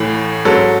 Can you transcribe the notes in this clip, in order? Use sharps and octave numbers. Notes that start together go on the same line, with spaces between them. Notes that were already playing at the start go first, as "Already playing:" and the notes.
Already playing: A1 A2 E3 A3
G#2 F#3 C#4 A4